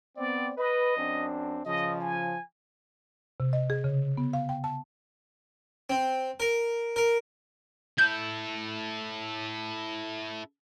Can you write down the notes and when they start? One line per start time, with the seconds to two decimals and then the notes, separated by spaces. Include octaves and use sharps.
0.17 B3 C4 D5
0.58 B4 D#5
0.97 F#2 C4 D4
1.65 C#3 F3 D#5
2.00 G#5
3.40 C3
3.53 D#5
3.70 G#4
3.84 C#3
4.17 B3
4.33 F5
4.49 G5
4.64 A5
5.90 C4
6.40 A#4
6.96 A#4
7.98 E4 A4 G6